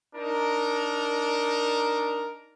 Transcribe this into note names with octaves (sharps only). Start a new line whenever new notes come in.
D4 D#4 A#4